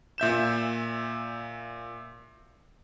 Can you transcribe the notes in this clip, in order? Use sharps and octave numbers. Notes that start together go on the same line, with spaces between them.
A#2 E5 G6 E7